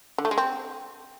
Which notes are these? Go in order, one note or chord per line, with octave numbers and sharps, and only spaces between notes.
D3
A3
G#3
C4